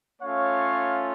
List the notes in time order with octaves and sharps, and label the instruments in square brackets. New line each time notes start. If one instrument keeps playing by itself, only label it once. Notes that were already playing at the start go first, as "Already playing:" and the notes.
[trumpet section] A3 C#4 F4 C#5 F5